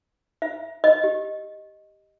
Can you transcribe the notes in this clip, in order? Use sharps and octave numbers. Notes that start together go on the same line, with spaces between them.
E5
D#5
G4